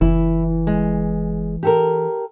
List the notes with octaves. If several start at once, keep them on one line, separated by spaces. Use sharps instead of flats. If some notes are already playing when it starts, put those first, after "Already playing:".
F#1 E3 E4
G#3
G4 A4 A#4